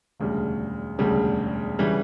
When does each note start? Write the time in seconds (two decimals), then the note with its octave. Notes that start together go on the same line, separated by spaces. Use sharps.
0.20 E1 D2 C#3 G3
0.99 E1 D2 C#3 G3
1.79 C#3 E3 G3